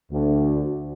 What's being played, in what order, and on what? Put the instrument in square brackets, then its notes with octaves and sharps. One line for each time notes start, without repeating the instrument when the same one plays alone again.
[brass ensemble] D2